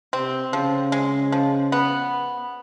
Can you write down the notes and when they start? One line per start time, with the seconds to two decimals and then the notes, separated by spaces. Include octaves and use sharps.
0.13 C3 C4
0.53 C#3 F3
0.92 G#3
1.32 F3
1.72 B3